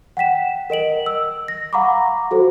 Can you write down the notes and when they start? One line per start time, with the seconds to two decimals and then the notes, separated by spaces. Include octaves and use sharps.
0.17 F#5 G5 B6 E7
0.70 A#4 D#5 D7 F#7
1.06 E6
1.48 A#6
1.73 F5 F#5 A#5 B5 C#6 D6
2.31 F#4 A4 C5